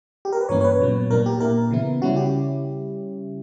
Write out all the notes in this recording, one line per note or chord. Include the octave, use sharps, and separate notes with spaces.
G4
A#4
B4
G2 E3 A#3 C#4 C#5
C#5
B4
A#2 F#3 B3
A#2 A#3 D4 A#4
G4
A#2 A#3 E4 A#4
C#3 E3 B3 E4
C#3 G3 C#4 E4 F#4
G4